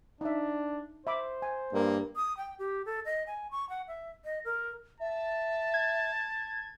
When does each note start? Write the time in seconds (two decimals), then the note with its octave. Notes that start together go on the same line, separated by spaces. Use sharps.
0.21 D4 D#4 E5
1.07 C5 E5 B5 D6
1.42 G#5
1.73 G2 A#3
2.16 D#6
2.37 G5
2.59 G4
2.86 A4
3.05 D#5
3.27 G#5
3.51 C#6
3.69 F#5
3.88 E5
4.25 D#5
4.45 A#4
5.00 E5 A5
5.74 G#6